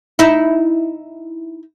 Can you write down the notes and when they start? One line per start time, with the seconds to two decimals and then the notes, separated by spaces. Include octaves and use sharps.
0.19 D#4 E4